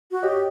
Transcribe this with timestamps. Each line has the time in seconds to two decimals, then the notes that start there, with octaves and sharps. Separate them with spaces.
0.11 F#4
0.23 G4 C#5 D#5